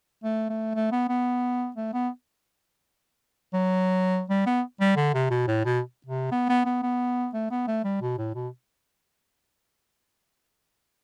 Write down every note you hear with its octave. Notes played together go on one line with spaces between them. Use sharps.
A3
A3
A3
B3
B3
A3
B3
F#3
G3
B3
G3
D3
C3
B2
A2
B2
C3
B3
B3
B3
B3
A3
B3
A3
G3
B2
A2
B2